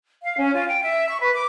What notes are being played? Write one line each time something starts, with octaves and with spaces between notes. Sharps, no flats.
F5
C#4
F4
G5
E5
C#6
B4
D6